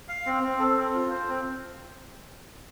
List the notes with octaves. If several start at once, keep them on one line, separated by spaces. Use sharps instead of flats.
F5
C4
C4
A4
C4
F4
C5
C4